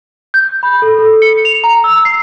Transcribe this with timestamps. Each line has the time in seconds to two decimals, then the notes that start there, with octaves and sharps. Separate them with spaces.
0.34 G6
0.63 B5
0.82 A4
0.98 A4
1.22 C#7
1.45 F7
1.64 A#5
1.84 E6
2.05 C7